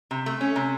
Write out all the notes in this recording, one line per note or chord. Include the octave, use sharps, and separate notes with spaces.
C3
A3
C#4
C3